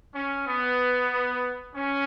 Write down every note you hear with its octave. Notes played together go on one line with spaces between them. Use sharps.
C#4
B3
C#4